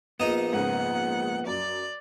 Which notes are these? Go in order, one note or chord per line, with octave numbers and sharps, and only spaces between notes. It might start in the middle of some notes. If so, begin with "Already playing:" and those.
A#1 B3 D#4 D#5 E7
G#2 C#3 F#5
F#2 D5